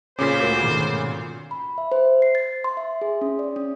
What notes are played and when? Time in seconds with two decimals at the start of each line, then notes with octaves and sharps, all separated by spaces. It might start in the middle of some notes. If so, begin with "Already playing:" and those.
0.19 A#2 C#3 C#4 C5 D6 B6
0.40 D2 F#4 A#4 D6
0.63 G#2 B2 D#3
1.51 B5
1.78 E5
1.92 C5
2.22 C7
2.35 A6
2.64 C6
2.77 E5
3.01 G#4
3.21 C#4
3.39 D5
3.56 C#4